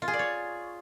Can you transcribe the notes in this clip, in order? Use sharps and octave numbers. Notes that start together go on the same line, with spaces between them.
F4
G#4
D5
C#5